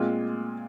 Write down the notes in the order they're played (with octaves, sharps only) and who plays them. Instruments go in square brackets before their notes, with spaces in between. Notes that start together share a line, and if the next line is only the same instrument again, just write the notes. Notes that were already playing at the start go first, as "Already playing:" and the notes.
Already playing: [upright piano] A#2 G#3 C4 F4